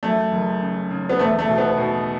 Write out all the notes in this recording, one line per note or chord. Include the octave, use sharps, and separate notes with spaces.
F#2 A3
F#1
C#3
C#3
B3
E1 A3
A3
B2
B3
B2